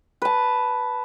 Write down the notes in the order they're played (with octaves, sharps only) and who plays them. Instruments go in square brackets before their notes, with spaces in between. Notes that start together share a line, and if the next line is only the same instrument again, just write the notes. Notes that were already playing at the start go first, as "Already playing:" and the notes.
[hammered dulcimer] B4 A5